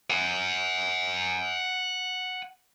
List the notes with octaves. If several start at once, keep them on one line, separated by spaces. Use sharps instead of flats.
F#5 G#5